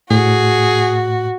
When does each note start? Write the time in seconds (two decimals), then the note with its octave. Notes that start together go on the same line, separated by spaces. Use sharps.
0.11 A2 F#4 G#4